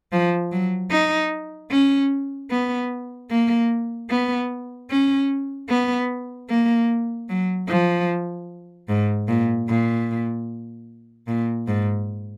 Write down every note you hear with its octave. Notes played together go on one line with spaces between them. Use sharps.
F3
F#3
D#4
C#4
B3
A#3
B3
C#4
B3
A#3
F#3
F3
G#2
A#2
A#2
A#2
G#2